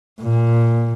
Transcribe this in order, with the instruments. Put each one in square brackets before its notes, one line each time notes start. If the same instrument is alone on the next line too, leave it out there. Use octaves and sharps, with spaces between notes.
[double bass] A#2